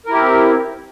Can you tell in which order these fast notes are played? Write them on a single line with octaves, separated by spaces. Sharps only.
A#4 E4 G4 C4